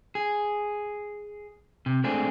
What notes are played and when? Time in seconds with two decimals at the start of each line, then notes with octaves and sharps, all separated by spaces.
0.15 G#4
1.86 C3
2.04 G#3 A3 C4 D4 G#4